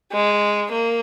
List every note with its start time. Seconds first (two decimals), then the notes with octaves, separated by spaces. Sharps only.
0.12 G#3
0.72 A#3